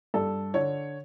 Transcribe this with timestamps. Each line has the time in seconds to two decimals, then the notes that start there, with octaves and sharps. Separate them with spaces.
0.14 G2 A4
0.54 D3 C#5